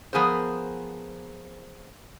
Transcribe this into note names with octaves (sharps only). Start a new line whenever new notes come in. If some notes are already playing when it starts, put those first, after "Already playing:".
F3 B3 G#4 A#4 C5